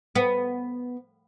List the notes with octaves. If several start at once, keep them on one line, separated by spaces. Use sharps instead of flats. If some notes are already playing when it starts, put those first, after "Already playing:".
B3